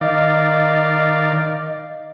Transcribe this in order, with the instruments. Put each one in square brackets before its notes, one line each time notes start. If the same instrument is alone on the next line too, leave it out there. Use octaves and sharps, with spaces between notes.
[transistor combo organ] D#3 D5 [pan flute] D#5 [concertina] F5